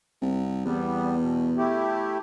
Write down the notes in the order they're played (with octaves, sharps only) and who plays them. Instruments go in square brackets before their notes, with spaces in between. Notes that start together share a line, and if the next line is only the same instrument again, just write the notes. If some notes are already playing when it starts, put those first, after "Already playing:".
[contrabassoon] C2
[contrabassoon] E2 [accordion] G3 B3
[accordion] B2
A3 E4 G4